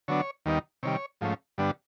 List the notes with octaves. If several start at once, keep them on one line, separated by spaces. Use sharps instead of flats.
D3 F#3 B3 D4 C#5
D#2 D#3 G3 B3 D#4
C3 D#3 G3 C#5
G#2 F3 A3 C#4
G2 D3 G3 B3 D4